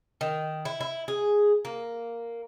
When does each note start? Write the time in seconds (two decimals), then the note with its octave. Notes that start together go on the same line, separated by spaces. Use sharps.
0.21 D#3
0.65 E4
0.81 E4
1.08 G#4
1.65 A#3